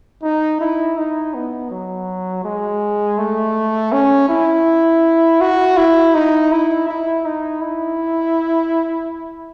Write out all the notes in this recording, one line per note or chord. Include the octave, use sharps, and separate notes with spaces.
D#4
E4
D#4
B3
F#3
G#3
A3
C#4
E4
F#4
E4
D#4
E4
E4
D#4
E4